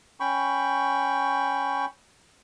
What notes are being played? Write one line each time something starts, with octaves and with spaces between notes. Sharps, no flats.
C#4 G5 B5 C#6